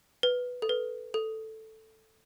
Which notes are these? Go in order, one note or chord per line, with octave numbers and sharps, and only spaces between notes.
B4
A4
B4
A4